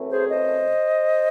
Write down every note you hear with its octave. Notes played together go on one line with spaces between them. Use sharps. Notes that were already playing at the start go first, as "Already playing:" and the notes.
Already playing: F#2 E3 A3 C4
G#4 C5
C5 D#5